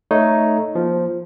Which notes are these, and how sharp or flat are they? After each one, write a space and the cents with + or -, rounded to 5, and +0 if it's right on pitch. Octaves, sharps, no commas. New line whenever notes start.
A3 +0 D#4 +0 C#5 +0
F3 +0 A#3 +30